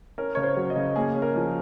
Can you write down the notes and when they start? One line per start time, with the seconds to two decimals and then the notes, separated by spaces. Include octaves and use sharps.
0.18 C#4 A#4
0.35 C#3 C#5
0.43 C5
0.57 F#3
0.70 D#5
0.76 C#3
0.96 A#3 G#4
1.16 C#4
1.22 A#4
1.36 F3